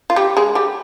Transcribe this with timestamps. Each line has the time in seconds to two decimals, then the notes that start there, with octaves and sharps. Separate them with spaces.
0.10 F4
0.16 G3 G4
0.37 G#3 G#4
0.55 G3 G4